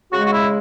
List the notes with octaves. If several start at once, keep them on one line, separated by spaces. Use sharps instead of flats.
C#3 G#3 F#4
F#4
E4